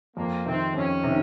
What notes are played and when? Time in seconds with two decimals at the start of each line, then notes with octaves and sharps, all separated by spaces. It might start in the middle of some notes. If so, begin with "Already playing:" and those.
0.17 F2 A#3
0.46 C3 D#3 C4
0.74 F2 C#4
1.03 C3 D#3